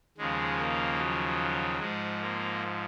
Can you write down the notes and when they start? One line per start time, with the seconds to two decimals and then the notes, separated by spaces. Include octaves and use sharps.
0.18 D#2 C#3 F3 G#3
0.58 A#3
0.99 F#3
1.80 G#2 F3 G#3
2.21 A#3